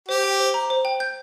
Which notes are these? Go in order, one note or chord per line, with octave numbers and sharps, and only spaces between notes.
G4 C5
G5
C5
A#5
C5
G5
G6